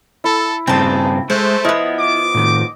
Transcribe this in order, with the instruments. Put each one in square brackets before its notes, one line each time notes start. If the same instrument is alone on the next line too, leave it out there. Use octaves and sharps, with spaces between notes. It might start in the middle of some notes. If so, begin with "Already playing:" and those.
[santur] E4 [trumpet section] A4
[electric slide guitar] G2 C#3 C4 [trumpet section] D#4 G#4 [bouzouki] G5 A5
[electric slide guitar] G#3 [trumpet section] A3 [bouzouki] C5
[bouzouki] F3 B3 [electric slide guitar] E4 [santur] D#5
[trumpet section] D6
[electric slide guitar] A2 D#3